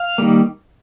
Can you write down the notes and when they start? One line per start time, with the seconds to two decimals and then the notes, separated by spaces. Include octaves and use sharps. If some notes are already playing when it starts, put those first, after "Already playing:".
Already playing: F5
0.18 D#3 G3 A#3